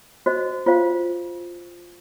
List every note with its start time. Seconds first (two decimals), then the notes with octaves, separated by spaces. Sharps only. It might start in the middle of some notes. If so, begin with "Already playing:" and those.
0.26 F#4 C5 D#5
0.66 F4 C5 F5